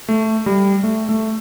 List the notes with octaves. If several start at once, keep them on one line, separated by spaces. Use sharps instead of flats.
A3
G3
A3
A3